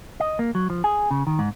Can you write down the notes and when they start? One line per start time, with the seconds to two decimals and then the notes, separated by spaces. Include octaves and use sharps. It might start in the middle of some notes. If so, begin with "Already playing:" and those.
0.20 D#5
0.39 A#3
0.55 F#3
0.70 F3
0.84 G#4
1.11 C#3
1.27 D#3
1.39 G#2